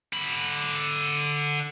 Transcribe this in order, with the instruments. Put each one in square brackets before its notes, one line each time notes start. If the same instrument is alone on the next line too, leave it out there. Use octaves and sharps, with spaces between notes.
[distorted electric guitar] D3 B5